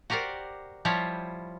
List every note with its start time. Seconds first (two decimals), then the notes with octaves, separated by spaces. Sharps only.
0.10 F#4 G4 A#4 C5 D5
0.85 F3 G3 E4 F4 C5 C#5